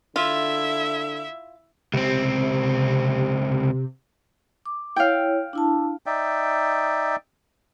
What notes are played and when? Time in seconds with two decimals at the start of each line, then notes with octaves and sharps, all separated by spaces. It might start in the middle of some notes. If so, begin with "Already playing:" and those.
0.16 D3 E4 F4 E5
1.94 C#2 C3 C4
4.66 D6
4.96 E4 C#5 F5 G5
5.53 D4 E4 A5
6.06 D#4 D5 E5 G5